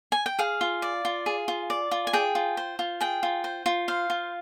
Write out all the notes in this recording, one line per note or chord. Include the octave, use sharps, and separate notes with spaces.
G#5
G5
G#4 F5
F4
D5
F4
G#4
F4
D5
F4
G#5
G#4 G5
F4
C5
F4
G#4 G5
F4
C5
F4
C5 F5
F4